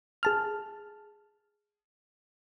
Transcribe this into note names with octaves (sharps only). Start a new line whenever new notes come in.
G#4 A5 F6